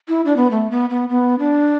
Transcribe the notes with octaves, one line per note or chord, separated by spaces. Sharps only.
E4
D4
B3
A3
B3
B3
B3
D4